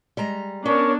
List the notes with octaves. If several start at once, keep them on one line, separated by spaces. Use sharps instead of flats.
G3 G#3 A#5
B3 C#4 D4 A#4 C#5